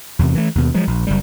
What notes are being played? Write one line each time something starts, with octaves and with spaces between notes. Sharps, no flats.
E2 C3
E3 A3
D#2 B2
F3 F#3 G#3
A#1
F#1 G3